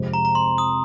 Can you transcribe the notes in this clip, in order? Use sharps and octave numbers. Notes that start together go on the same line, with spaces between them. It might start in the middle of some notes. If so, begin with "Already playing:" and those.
Already playing: F2 C3 G#3
A#5
A#5
C6
D#6